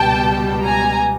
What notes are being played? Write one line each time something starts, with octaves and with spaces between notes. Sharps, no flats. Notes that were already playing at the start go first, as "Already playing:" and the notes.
Already playing: C#2 B2 G3 B3 G5 A5
G#5 A#5